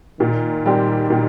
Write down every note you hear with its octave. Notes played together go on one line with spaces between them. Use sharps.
A#2 D#3
G3 C4 G4
A#2